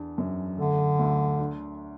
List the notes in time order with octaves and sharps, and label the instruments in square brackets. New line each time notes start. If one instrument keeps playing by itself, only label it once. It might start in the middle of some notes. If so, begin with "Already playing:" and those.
Already playing: [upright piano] E2 D4
F#2
[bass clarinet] D3 [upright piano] A3
[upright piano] D2
D4